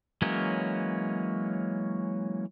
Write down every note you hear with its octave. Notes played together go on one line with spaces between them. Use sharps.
E3 F#3 G#3 A#3 C#4